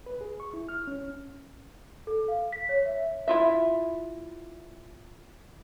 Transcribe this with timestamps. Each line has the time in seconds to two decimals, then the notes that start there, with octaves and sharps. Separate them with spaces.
0.06 B4
0.21 G#4
0.40 C#6
0.54 E4
0.69 F6
0.87 C#4
2.07 A4
2.28 F5
2.52 B6
2.69 C#5
2.86 E5
3.28 E4 F4 E5